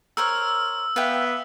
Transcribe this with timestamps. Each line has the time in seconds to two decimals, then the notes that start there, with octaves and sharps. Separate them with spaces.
0.17 A#4 C5 C#5 E6 F6
0.96 B3 E5 F5 G5